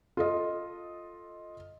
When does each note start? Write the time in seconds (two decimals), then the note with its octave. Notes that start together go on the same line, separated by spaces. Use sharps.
0.17 F4 A4 D#5